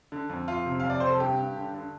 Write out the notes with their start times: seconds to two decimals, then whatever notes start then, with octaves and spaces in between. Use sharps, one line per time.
0.12 D3
0.29 F2
0.48 F2 F4
0.66 C3
0.80 F2 F5
0.90 D5
1.00 C3 C5
1.10 A4
1.20 G2 G4
1.38 G2
1.57 D3
1.74 D3